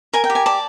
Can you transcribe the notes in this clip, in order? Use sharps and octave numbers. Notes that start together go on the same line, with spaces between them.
A#4 G#5
G5
G4
G#5
D5 A5